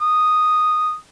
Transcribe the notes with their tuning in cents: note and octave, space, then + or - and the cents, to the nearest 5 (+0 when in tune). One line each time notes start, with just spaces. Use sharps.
D#6 -5